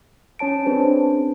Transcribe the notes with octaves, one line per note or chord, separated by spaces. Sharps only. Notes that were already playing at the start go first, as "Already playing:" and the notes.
C#4 C#5 A5 D7
C4 D4 G#4 B4 C5